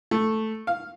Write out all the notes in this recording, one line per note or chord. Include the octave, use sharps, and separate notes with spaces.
A3
F5